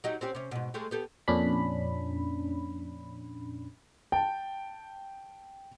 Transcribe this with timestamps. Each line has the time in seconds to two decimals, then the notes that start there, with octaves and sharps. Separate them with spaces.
0.04 F#3 D#4 G4
0.21 C4 C#4 G4
0.35 C3 C#4
0.51 G#2 B2
0.74 G#3 A3 G4
0.91 B3 G4 A4
1.28 F2 A#2 C#4 D4 B5
4.12 G5 A5